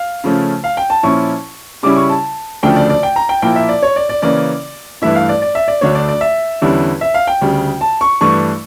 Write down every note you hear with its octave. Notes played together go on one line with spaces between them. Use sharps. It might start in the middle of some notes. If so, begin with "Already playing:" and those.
Already playing: F5
C#3 F3 A3 C#4
F5
G5
A5
A#2 F3 C#4 E4 C#6
C#3 G3 C#4 E4 D6
C#6
A5
D2 C#3 F3 A3 D4 G5
D5
D5
G5
A#5
G5
A#2 F3 A#3 E4 G5
E5
D5
C#5
D5
D5
C#3 E3 A#3 C#4 D5
G2 E3 A3 E4 E5
F5
D5
D5
E5
D5
D2 D3 A3 D4 C#5
D5
D5
E5
E2 D3 G3 C#4 E4
E5
F5
G5
D2 C#3 G3
A5
C#6
G2 E3 A3 D4 C#6